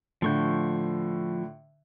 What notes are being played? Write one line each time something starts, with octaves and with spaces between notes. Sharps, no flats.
A2 D3 F3 C#6 G6